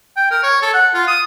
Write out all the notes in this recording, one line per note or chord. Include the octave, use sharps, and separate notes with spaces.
G5
A#4
C#5
A4
F#5
F4
D#6